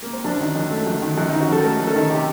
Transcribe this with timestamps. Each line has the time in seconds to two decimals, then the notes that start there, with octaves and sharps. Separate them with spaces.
0.02 A#3
0.13 C4
0.24 F#2 D4
0.40 D#3
0.55 F#2
0.71 A3
0.87 F#2
1.02 D#3
1.18 F#2
1.29 D#3 D#4
1.40 F#4
1.49 F#2 A4
1.64 A3 A#4
1.80 F#2
1.87 A4
1.95 D#3
2.11 C3 G4